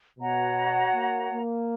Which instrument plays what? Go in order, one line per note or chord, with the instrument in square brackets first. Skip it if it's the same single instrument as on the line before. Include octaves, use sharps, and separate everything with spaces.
[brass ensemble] B2 [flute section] F#4 C#5 F#5 A#5
[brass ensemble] A#3
A#3